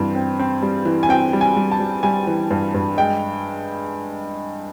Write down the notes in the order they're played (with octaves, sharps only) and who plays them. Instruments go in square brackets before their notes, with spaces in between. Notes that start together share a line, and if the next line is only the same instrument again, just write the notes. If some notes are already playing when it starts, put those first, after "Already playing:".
Already playing: [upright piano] G2 E3 C4
C4
C4
G3
E3
G#5
C4 G5
G3
G#5
G3
A5
G3
G3 G#5
E3
G2
G2
G#3 G5